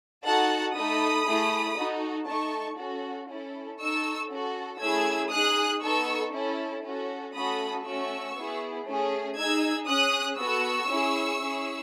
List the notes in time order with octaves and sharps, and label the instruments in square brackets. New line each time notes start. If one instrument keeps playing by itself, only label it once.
[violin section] D#4 F#4 A4 F#5 A5
A3 D#4 A4 B5 D#6
A3 E4 G#4
D#4 F#4 A4
A3 D#4 A4 A5 C#6
C#4 F#4 A4
C#4 E4 A4
D#4 A4 C#6 E6
C#4 F#4 A4
A3 C#4 E4 G#4 E6 G#6
D#4 G#4 D#6 F#6
B3 D#4 A4 C#6 E6
C#4 E4 A4
C#4 F#4 A4
A3 C#4 F#4 A4 B5 D#6
A3 C#4 F#4 C#6 E6
B3 E4 G#4
A3 C#4 G#4
D#4 G#4 E6 G#6
C#4 G#4 D#6 F#6
B3 F#4 A4 C#6 E6
C#4 E4 G#4
C#4 E4 G#4